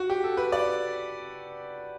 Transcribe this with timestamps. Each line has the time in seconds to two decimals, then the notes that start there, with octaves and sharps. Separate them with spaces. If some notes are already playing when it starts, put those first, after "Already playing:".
Already playing: F#4
0.10 G4
0.24 A4
0.37 B4
0.52 D5